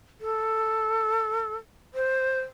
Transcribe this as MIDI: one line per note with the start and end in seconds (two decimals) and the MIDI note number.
0.21 1.55 69
1.94 2.40 72